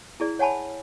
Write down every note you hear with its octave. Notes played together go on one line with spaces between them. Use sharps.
E4 G#4 D5
C#5 F#5 G#5 A5 B5